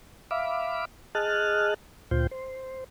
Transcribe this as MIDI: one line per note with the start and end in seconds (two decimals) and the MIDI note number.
0.31 0.85 76
0.31 0.85 77
0.31 0.85 83
0.31 0.85 86
1.15 1.74 68
1.15 1.74 75
1.15 1.74 81
1.15 1.74 89
1.15 1.74 90
2.11 2.27 38
2.11 2.27 46
2.11 2.27 65
2.11 2.27 72
2.11 2.27 79
2.31 2.84 72